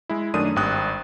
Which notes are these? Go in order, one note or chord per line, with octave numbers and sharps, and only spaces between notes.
G#3 E4
F#2 D#3 A3 D4 D#6 D#7
G#1 G2 G5 D#6 F#6